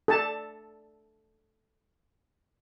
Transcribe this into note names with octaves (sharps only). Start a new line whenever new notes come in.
A4 A5